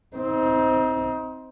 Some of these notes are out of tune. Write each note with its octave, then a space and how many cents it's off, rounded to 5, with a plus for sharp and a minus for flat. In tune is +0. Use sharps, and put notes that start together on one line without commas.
C4 +0 D#4 +30